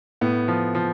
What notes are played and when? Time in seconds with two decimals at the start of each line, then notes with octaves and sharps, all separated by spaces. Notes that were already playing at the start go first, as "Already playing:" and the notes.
0.21 A2 B3
0.48 F3
0.75 F3